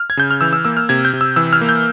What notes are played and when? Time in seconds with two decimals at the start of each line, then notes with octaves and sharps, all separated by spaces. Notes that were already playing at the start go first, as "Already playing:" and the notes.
Already playing: F6
0.10 G#6
0.17 C#3 G6
0.31 F6
0.41 E3 E6
0.53 E6
0.65 A#3 E6
0.77 F6
0.89 C3 G#6
1.05 G6
1.13 C3
1.21 E6
1.36 E3 E6
1.53 F6
1.61 A#3
1.69 G6